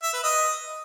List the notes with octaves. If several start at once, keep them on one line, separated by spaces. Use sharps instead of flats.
E5
B4
D#5